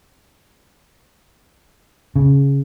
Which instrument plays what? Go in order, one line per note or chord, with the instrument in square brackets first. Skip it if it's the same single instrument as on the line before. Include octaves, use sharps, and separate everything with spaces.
[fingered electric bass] C#3